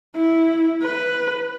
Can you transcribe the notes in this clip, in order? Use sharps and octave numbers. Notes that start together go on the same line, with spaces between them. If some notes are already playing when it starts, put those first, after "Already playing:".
E4
B4